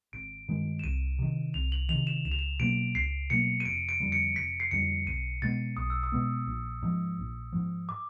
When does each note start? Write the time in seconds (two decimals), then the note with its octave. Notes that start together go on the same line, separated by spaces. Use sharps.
0.13 G#1 D7
0.48 G2 D#3 G#3
0.79 E7
0.84 C2 D#7
1.19 C3 D#3
1.54 C2 F7
1.72 F#7
1.89 D#3 F7
1.94 C3
2.07 E7
2.25 C#2 E7
2.32 F7
2.39 E7
2.60 B2 F#3 A#3 D7
2.95 C#2 C7
3.30 B2 F#3 A#3 C#7
3.60 D#7
3.65 F1 D7
3.89 D7
4.00 F2 D3 G3
4.12 C#7
4.35 F1 B6
4.60 C7
4.71 F2 D3 G3 C#7
5.06 B1 D#7
5.42 B2 G#3 B3 A6
5.77 B1 D#6
5.90 E6
6.03 D#6
6.12 B2 G#3 B3
6.47 A#1
6.82 G#2 F3
7.19 A#1
7.53 G#2 F3
7.89 D6